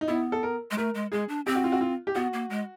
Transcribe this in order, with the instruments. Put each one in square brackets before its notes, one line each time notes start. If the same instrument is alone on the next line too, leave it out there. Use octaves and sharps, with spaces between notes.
[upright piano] D#4
[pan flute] B3 [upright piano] E4
[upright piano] A4
A#4
[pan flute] G#3
[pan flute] A3 [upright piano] A#4
[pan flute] G#3
[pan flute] G#3 [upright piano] G#4
[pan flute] D4
[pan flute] C4 [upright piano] G4
[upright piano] F#4
F4
F#4
F4
G4
[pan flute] B3 [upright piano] F#4
[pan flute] A#3
G#3